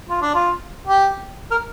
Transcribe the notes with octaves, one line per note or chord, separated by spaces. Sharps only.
F4
D4
F4
G4
A#4